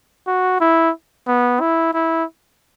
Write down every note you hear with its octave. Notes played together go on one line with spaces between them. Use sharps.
F#4
E4
B3
E4
E4